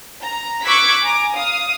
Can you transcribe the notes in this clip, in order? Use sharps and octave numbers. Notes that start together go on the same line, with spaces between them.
A#5
C#6 D6 E6 F#6 G#6 B6
G#5 A#5 D6
F5 D#6